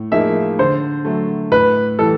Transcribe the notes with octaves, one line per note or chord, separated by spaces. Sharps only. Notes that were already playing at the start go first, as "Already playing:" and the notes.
Already playing: A2
F3 A#3 D#4 G#4 E5
D3 C5
F#3 A3
A2 B4
E3 G3 A4